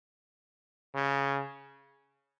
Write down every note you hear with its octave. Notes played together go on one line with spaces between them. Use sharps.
C#3